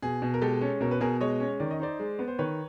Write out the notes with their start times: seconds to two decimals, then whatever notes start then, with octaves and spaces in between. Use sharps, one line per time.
0.02 B2 G#4
0.22 B2
0.34 A#4
0.42 G#3 G4 A4
0.61 C#4
0.81 B2 A#4
0.91 B4
1.00 B2 G#4 A#4
1.21 G#3 C#5 D#5
1.40 C#4
1.60 D#3 D5
1.71 D#5
1.80 D#4 C5 D5
1.99 G#3
2.19 B3
2.28 C5
2.39 D#3 B4 C#5